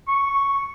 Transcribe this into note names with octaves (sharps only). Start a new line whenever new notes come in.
C#6